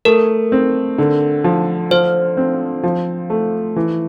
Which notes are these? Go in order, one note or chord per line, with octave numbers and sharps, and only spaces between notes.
A3 A#4
C4
D3
F3
F3 C5
C4
F3
A3
E3